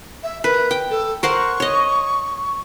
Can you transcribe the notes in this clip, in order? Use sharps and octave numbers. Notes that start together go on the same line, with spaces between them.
E5
A#4 B4
G5
A4
A#4 C5 F#5 C#6
C#5 D#5